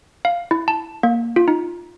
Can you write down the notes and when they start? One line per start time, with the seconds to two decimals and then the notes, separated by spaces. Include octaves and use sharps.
0.25 F5
0.51 E4
0.68 A5
1.03 A#3
1.36 F4
1.48 D#4